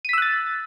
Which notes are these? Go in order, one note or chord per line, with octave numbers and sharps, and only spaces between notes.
E6 F#6 A6 B6 D#7